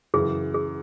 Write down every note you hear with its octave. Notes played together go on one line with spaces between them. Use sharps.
F#2 C#3 E3 G#4
G#4